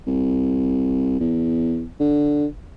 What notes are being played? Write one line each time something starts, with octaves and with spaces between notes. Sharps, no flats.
C2
E2
D3